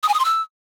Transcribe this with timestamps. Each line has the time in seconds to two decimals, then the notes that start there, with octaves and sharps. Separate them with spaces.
0.03 D#6
0.08 G#5
0.14 D#6
0.19 C6
0.25 E6